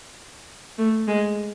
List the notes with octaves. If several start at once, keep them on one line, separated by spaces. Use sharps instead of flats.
A3
G#3